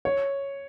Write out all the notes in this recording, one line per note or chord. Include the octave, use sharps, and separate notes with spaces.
C#5